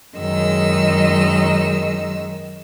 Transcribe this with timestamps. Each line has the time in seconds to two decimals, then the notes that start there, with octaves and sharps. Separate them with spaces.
0.17 F#2 D#3 G#3 D#5 E6